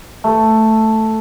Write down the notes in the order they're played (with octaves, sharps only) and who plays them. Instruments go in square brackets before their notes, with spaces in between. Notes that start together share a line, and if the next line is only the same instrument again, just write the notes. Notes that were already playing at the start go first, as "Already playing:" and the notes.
[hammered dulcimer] A3